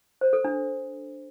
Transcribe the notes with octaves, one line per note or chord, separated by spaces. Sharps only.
C5
A4
D4